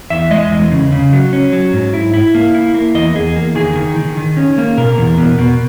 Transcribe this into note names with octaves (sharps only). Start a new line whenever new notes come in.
E2 E5
G#3 D#5
E2
C#3
C#3
F#3
C#4
F#3
G#2
E4
E4
A#3
E4
A#3
E2 D#5
E2 G#4
A#3
D#3 G#4
D#3
D#3
D#3
C#4
A#3
B2 A#4
E2
B2
B2